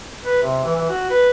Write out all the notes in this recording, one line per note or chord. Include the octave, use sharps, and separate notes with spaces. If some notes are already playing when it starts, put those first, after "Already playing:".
B4
C3
E3
E3
F#4
B4